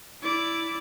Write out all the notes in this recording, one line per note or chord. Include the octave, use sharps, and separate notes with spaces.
E4 D5